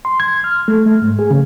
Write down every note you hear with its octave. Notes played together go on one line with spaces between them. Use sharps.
C6
G#6
F6
A3
A3
G#2
G#4
C#3